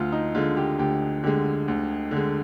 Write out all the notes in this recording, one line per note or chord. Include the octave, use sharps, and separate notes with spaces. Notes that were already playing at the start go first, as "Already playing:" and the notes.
Already playing: D2 F4
D#4
D3 G#3 F4
G4
D2 G4
D3 G#3 G4
D2
D3
G#3